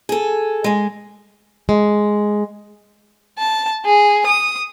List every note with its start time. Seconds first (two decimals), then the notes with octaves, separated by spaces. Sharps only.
0.09 G#4 A4
0.64 G#3 G#4
1.69 G#3
3.39 A5
3.85 G#4
4.27 D#6